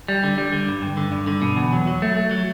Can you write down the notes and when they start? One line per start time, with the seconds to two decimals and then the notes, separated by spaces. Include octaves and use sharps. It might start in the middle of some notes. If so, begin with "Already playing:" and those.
0.08 G3
0.24 D3
0.38 G3
0.52 D3
0.68 G2
0.82 G2
0.97 D3
1.12 G2
1.27 D3
1.42 B2
1.57 E2
1.73 F#3
1.87 F#3
2.02 A3
2.17 A3
2.31 F#3